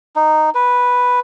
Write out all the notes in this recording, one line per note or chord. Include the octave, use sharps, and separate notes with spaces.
D#4
B4